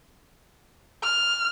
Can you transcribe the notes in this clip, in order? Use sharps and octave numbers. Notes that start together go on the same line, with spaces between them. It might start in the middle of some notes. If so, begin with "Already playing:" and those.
F6